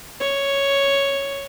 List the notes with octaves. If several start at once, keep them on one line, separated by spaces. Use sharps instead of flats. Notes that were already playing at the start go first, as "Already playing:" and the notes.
C#5